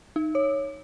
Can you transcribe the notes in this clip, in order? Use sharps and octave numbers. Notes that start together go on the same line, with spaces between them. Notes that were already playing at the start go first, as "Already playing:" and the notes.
D#4
C#5